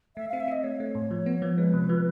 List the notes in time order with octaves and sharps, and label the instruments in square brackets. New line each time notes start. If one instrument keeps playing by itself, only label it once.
[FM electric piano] A3 [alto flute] E5
[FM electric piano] C4 [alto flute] F5
[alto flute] E5
[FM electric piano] C4 [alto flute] D#5
[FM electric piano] A3 [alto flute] C#5
[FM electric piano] A3
A2
F3
B3
F3
[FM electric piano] G#3 [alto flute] B4
[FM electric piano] C3
F3